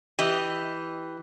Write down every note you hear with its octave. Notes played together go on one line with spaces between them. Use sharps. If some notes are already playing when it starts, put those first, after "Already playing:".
E3 G4 D#5